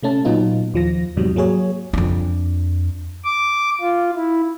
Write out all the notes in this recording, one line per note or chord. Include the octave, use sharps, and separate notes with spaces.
C3 A3 C#4 A5
A#2 F#3 B3 D#4 F4
D#2 F3 A#6
E2 G#2 C3 F#3 G3
F#3 A#3 G#4 C#5
F2 D4
D6
F4
E4